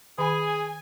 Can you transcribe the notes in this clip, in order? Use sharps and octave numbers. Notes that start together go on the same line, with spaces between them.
D#3 G#4 G#5 B5